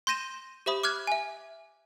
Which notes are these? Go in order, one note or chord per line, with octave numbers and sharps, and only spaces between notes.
C6 G6 A#6 D#7 E7
G4 C5 E5 B5 D#6
D6 F6 F#6 G#6
E5 G#5